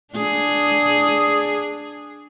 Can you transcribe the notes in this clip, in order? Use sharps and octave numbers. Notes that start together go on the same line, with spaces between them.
D4 G#4